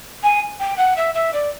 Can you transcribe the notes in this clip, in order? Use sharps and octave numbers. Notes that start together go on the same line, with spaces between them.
G#5
G5
F#5
E5
E5
D5